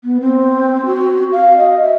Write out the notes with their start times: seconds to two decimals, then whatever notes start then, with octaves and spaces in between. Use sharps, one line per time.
0.04 B3
0.21 C4
0.86 F#4
1.32 F5
1.57 D#5
1.83 E5